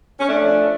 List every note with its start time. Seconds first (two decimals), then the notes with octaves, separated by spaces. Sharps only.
0.20 C#4
0.28 A3 D4
0.42 F3